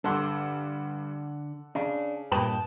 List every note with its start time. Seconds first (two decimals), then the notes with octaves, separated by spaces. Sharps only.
0.04 G2 D3 A4 F#5 C6
1.75 C#3 D4
2.32 G2 A#2 B4 G5 A5 D#6